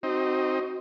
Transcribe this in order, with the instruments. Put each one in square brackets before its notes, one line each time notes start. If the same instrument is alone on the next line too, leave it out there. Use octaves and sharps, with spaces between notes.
[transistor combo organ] C4 D#4 [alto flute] F#4